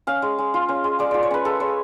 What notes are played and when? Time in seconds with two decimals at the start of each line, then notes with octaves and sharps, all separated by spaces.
0.07 C#4 F5
0.22 G#3
0.39 G#3
0.54 F4
0.69 C#4
0.84 G#3
0.99 G#3 D5
1.11 F4 D5
1.23 C#5
1.31 C#4 B4
1.45 G#3 A4
1.60 G#3 C#5